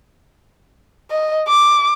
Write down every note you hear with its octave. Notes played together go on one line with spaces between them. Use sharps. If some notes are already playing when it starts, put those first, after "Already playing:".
D#5
D6